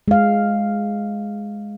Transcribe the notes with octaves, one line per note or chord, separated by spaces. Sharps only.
G#3 F5